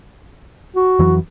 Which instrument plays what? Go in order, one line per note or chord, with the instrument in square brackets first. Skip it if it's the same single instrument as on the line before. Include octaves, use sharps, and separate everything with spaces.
[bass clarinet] F#4
[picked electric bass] F2 E3 F#3